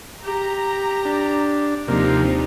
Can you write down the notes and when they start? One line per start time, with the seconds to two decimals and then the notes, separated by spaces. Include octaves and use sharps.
0.23 G4 A#5
1.05 D4
1.88 D#2 C3 F3 A#3 D4 D#4 G4